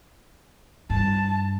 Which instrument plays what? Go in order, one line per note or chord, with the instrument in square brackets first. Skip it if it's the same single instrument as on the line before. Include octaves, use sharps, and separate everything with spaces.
[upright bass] G2 [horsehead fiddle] A5